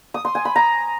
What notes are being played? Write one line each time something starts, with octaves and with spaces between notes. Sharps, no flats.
D#6
C6
G#5
B5
A#5